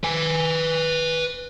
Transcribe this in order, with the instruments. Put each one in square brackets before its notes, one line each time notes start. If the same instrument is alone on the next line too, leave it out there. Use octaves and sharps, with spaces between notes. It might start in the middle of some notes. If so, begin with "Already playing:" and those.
[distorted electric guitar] B4 G#5